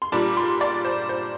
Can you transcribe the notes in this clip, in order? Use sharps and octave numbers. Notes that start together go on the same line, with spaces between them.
C6
A#2 G3 D4 D6
C6
D5
C5
C5